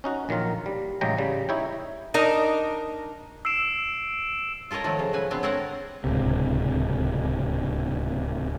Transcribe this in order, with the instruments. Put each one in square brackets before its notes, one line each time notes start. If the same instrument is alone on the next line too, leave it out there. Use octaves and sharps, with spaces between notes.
[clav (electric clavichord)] C#4 D#4 F#4
A#1 D#3 F#3 F4 A#4
G3
A1 C#3 F#3 G#3 G5 A#5
C#3 G3
D#4 E4 C#5 G5
[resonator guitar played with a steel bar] D4 D#4 A#4 D#5
[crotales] E6 C7 D7 E7
[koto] F4 A4 A#4 C#5 D#5
D#3 F3 F#3 A3
C#3
C#3 B4 G#5
D3 B3 C4
C4 A4 A#4 C#5 F#5
[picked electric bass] D1 C#2 C3